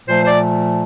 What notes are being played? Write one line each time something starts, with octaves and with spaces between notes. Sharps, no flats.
A#2 F3 A3 C5
C5
D5